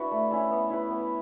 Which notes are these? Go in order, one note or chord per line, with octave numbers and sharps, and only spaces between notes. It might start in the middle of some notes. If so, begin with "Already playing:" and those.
Already playing: D4 E4 F#4 B4 E5
A3
C#4 E4 A4
B3
E4 B4
B3